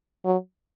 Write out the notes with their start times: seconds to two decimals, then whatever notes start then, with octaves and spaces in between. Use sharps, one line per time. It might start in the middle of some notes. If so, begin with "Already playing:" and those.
0.25 F#3